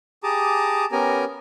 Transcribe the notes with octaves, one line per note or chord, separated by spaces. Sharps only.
G4 G#4 A5 A#5 D6 D#6
B3 C#4 G4 A#4 G#5 A#5